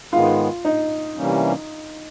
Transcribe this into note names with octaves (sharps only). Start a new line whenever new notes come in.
G#2 D#3 G#3 B3 F4
D#4
C3 E3 G3 A#3 C#4